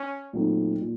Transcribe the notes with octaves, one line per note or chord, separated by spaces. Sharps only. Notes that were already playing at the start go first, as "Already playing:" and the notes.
Already playing: C#4
A#2 F#3 A3 C4 D#4
A#2